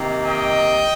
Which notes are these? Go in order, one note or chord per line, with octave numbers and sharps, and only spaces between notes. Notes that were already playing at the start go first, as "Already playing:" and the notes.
Already playing: C3 D#3 A#3
D#5 G5